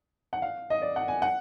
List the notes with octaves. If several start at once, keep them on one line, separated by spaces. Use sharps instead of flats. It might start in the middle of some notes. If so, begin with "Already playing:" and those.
F#5
F5
D#5
D5
F#5
G#5
F#5